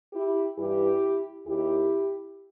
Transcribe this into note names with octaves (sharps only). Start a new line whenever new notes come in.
E4 G4
G2 E3 E4 G4
D#2 D#3 E4 G4